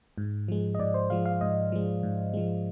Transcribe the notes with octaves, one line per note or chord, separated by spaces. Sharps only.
G#2
F3 G#3
D#5
G#2 D5
C5
F3 G#3 F5
F5
G#2 D#5
F3 G#3
G#2
F3 G#3